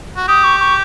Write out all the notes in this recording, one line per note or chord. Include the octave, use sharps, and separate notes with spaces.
F#4
G4 D#6
C#6
C#6